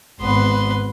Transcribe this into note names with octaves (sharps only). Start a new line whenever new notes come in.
G#1 B3 B4 C6